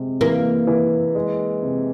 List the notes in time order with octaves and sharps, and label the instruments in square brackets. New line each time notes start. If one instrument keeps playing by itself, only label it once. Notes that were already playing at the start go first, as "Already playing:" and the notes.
Already playing: [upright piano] C3 G#3
[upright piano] E3 [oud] A#3
[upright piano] E3
G#3
C3